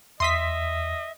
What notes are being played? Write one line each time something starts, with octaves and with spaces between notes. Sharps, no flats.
E2 D#5 E5 C6 D#6 B6